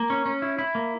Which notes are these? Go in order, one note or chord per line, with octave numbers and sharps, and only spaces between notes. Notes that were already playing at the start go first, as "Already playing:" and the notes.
Already playing: A#3
C#4
C#4
E4
E4
A#3